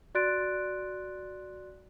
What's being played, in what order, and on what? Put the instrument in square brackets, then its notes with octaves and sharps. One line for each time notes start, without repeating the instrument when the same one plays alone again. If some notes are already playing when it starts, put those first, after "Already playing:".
[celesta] F#4 D5 C6 F#6 A6 D7